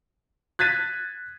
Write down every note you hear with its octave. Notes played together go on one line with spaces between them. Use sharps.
F#6 G#6 A6 B6 D#7